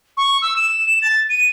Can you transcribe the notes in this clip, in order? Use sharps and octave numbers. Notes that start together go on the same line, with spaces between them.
C#6
E6
E7
A6
D#7